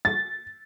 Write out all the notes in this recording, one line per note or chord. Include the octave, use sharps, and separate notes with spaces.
A6